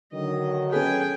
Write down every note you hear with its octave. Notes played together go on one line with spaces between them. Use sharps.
D3 D#3 F#3 D#5
C#4 G#4 A4 B4 G5 G#5